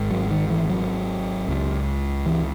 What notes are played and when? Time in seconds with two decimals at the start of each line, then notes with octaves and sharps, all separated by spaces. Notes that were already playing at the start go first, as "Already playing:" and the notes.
Already playing: G#1 G#2
0.11 F#3
0.30 D#3
0.50 E3
0.70 F#3
1.48 C#2 C#3
2.26 E3